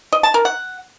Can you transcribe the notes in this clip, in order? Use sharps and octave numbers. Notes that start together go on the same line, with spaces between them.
D#5
A5
A#4
F#5